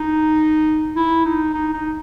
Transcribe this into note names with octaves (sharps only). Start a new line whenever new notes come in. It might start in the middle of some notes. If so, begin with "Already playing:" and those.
Already playing: D#4
E4
D#4
D#4
D#4